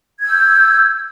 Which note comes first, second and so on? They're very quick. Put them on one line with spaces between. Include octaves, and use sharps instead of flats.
G#6 E6 G6